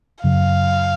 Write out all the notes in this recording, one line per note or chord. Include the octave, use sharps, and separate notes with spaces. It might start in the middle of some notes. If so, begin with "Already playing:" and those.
F#2 C#3 F#3 F5